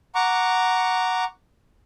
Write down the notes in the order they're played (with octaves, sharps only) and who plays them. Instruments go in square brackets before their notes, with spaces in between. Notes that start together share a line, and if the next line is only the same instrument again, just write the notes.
[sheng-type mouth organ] F#5 A#5 C#6 D6